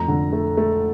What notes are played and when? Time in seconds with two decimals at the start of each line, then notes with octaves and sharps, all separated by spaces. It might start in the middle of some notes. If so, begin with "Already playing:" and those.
Already playing: F2 A2 A3 A#5
0.08 D3
0.33 A3
0.57 A3